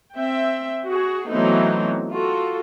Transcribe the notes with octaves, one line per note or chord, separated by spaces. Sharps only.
C4 E5 G5
F#4 G#4
E3 F#3 A3 B3 C4 D#4
F4 F#4 A4